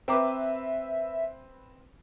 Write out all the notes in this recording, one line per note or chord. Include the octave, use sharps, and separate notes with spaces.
C4 B4 E5 G5 A#5 D6